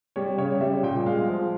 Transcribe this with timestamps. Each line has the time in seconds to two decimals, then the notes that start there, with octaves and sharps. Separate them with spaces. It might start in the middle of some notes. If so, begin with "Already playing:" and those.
0.16 G3 C#5
0.38 C#3 C#5
0.61 G3 E5
0.83 A#2 G5
1.06 G#3 F5
1.28 F3